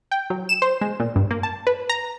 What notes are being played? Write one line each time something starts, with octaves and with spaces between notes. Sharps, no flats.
G5
F#3
E7
C5
G#3
A#2
G2
A#3
A5
B4
A#5